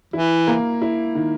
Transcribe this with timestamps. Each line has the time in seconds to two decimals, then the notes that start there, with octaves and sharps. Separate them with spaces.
0.13 E3 E4
0.47 A#3
0.82 E4
1.15 D#3